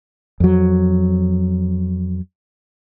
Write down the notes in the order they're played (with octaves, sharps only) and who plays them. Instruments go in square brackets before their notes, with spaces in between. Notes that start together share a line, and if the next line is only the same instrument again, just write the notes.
[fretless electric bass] F2 F#3